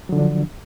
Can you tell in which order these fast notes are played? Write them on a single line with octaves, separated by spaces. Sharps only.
F#3 D3 F3 D4